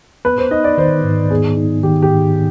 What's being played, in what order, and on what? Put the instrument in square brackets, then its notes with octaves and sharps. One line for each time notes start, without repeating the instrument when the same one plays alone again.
[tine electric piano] B3 [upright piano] B4
[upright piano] C5
[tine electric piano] D#4 [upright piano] D#5
[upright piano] D5
[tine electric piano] D#3 [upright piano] C5
[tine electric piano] G#2
[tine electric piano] B3 [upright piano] G#4
[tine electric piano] D#4
[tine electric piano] D#3 [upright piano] G4
[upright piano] G4
[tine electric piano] G#2